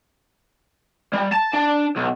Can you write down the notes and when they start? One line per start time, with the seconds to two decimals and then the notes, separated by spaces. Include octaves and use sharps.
1.14 G3
1.33 A5
1.54 D4
1.97 B1